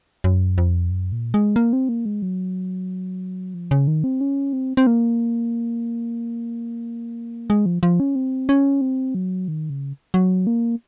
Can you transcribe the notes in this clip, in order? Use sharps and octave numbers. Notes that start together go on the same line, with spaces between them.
F#2
F2
F#2
A#2
G#3
A#3
C4
A#3
G#3
F#3
F3
C#3
D#3
C4
C#4
C4
C4
A#3
G#3
F3
F3
C#4
C4
C#4
C4
F#3
D#3
C#3
F#3
A#3